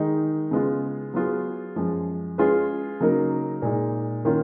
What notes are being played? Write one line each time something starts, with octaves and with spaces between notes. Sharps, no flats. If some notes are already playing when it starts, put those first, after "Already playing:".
Already playing: D#3 G#3 D#4
C#3 G#3 B3 F4
F#3 B3 F4 G#4
F#2 F3 G#3
G#3 C#4 F4 G#4 B4
C#3 F#3 A#3 D#4 A#4
A#2 G#3 D#4
D#3 A#3 C#4 F4